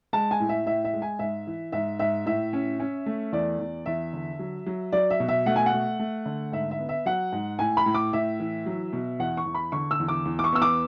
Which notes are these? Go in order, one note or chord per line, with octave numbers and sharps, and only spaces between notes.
G#3 A5
G#5
A2
E5
A2 E5
E5
G#3
G#5
G#2 E5
E3
G#2 E5
G#2 E5
A2 E5
C#4
C#4
A3
E2 D5
E2
E2 E5
D3
F#3
F#3
F#3 D5
E5
B2
E5
A3 F#5
G#5
F#5
A3
A3
D3
G#2 E5
E5
B3
E5
F#3 F#5
G#2
A2 G#5
B5
A2
D6
A2 E5
E3
F#3
B2
E2 F#5
C#6
E2
B5
D3 C#6
E6
E2
D6
E2
D6
C#6
B3 E6
D6